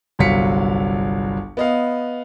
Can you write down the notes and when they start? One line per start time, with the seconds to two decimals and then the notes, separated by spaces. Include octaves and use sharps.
0.19 G1 C2 F#3 F5 B6 C#7
1.57 B3 D#5 F5